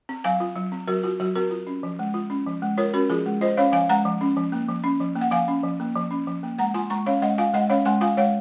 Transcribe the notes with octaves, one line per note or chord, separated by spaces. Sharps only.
C4
F#3 F5 G#5
F4
F#3
C4
F#3 F#4 A#4
F4 F#4
F#3 F#4
C4 F#4 A#4
F4
C#4
F3
G#3
F4
C#4
F3
G#3
F4 A#4 C#5
C#4 F#4 A#4
F3 F4 G#4
G#3
F4 C5 D#5
C#4 C#5 F5
F3 F5 G#5
G#3 F#5 A#5
F3
C#4
F3
A#3
F3
C#4
F3
A#3
F#5
F3 F5 G#5
C#4
F3
A#3
F3
C#4
F3
A#3
G#3 F#5 A#5
F4 G#5 C6
G#3 A#5 C#6
C#4 C#5 F5
G#3 D#5 F#5
F4 F5 G#5
G#3 D#5 F#5
C#4 C#5 F5
G#3 G#5 C6
F4 F5 G#5
G#3 C#5 F5